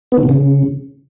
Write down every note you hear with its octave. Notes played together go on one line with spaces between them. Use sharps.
B3
D#3
B2
C#3